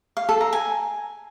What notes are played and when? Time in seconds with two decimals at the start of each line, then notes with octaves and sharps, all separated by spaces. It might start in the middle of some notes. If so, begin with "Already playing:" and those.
0.17 F5
0.29 A4
0.41 A#5
0.53 G#5